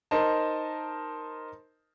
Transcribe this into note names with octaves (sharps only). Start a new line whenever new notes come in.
D#4 A#4 C5 D#5 A5